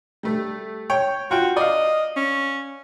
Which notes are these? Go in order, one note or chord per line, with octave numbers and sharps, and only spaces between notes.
G3 A3
C#5 G5
F4 F#4 G5
D5 D#5 F5
C#4